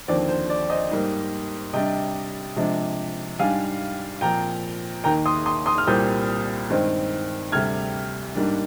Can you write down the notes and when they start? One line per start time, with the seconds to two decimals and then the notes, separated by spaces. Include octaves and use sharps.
0.08 D#2 D3 F3 C4 D5
0.29 C5
0.50 D5
0.70 C5 D#5
0.91 G#2 G3 A#3
1.73 C3 G3 D4 D#5 G5
2.56 C3 F3 G#3 D4
3.39 G#2 G3 D4 F5 G#5
4.21 A#2 F3 C4 G5 A#5
5.04 D#2 D#3 A#3 G5 A#5
5.26 C6 D#6
5.46 C6 D#6
5.66 C6 D#6
5.78 F6
5.87 C2 A#2 G3 C4 D#6 G6
6.70 G2 D#3 G#3 C4
7.52 D2 C3 G3 F6 G#6
8.35 G#2 G3 A#3 D4